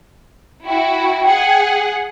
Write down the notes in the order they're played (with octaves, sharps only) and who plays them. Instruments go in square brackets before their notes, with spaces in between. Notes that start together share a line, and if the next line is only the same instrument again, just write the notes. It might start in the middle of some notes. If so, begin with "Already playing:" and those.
[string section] E4 F#4 [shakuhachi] G5
[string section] G#4 F#5